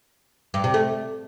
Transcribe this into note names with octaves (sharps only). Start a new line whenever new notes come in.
G2
C3
A3